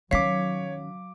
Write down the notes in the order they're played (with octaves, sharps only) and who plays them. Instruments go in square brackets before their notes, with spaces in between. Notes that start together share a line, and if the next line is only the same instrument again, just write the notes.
[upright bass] D#3 C#4 [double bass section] F#3 [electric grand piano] C#5 D6 [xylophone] F5 B6